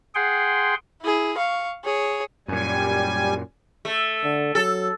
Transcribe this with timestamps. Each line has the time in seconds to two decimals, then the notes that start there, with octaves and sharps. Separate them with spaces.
0.15 G#4 F#5 G5 C6
1.02 E4 G#4
1.37 F5 C#6
1.84 G#4 C#5
2.48 F#2 A#2 G3 G#5
3.85 A3
4.24 D3
4.55 F#3 A4